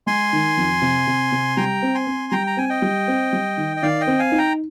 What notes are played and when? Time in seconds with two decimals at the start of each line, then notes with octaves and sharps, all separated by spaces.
0.07 G#3 G#5 C6
0.33 D#3
0.57 F2
0.82 C3
1.07 C3
1.32 C3
1.57 G3 G5 A#5
1.82 C4
1.94 G#5 C6
2.07 C4
2.32 G3 G5 A#5
2.47 A#5
2.57 C4 G#5
2.69 D#5 G5
2.82 G3
3.08 C4
3.33 G3
3.57 D#3
3.77 D#5
3.82 D#3 D5 F5
4.00 D#5 G5
4.07 C4
4.19 F5 G#5
4.32 D#4
4.38 G5 A#5